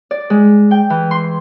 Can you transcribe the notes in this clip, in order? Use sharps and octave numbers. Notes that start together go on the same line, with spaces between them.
D5
G#3
G5
E3
C6